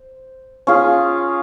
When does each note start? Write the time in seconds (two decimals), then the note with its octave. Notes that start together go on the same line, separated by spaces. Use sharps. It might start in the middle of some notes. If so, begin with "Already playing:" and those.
Already playing: C5
0.67 C#4 F4 G#4